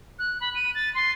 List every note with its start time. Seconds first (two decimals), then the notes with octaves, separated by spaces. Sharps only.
0.19 F#6
0.41 B5
0.55 D#7
0.75 A6
0.94 C6